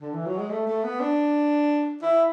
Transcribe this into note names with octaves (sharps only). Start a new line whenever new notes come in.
D3
E3
F#3
G#3
A3
A3
B3
D4
E4